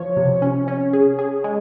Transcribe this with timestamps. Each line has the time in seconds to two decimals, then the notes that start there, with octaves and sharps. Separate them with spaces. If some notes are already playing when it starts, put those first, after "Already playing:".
Already playing: F3 C#5
0.17 C3
0.42 C#4
0.68 C#4
0.93 G#4
1.19 G#4
1.44 G#3